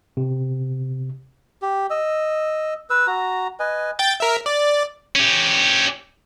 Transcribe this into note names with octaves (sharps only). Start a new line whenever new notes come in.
C3
G4
D#5 E6
B4 E6
F#4 A#5
B4 D#5 G#5
G5 G6 A6
A#4 E5
D5
C#4 G4